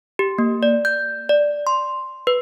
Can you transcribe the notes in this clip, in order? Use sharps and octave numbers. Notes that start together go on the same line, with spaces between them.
G4
A#3
D5
G6
D5
C6
B4